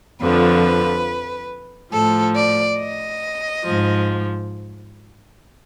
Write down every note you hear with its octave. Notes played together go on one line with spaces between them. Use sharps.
F2 D3 F3 B4
A2 F3 A4
D5
D#5
G#2 F3